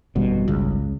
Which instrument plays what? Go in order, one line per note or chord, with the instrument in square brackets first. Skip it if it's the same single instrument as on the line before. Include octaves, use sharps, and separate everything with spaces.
[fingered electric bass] G#1 F#2 G3 [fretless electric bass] B2
[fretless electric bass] C#2